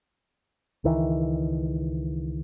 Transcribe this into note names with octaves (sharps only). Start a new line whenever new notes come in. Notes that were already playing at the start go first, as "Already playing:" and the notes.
C#2 D#3 E3